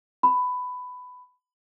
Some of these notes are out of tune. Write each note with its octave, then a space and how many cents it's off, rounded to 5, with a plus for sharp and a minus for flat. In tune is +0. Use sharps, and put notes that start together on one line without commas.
B5 +15